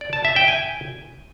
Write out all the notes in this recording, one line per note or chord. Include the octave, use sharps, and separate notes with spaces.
D5
A5
E5
G5
G#5